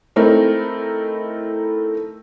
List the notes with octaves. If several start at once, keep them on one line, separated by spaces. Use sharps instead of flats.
A3 C4 D#4 E4 A#4